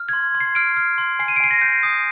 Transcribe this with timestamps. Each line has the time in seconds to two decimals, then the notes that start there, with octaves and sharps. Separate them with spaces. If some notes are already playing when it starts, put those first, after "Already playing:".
Already playing: F6
0.09 G#6
0.13 C6
0.35 C6
0.40 C7
0.55 F6 D7
0.76 F6
0.98 C6
1.19 G#5 C7
1.28 D#7
1.36 D7
1.40 G#5 C7
1.51 A#6
1.62 G6
1.83 D#6